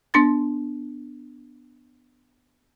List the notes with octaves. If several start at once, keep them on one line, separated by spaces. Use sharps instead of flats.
B3 D4 C6 A6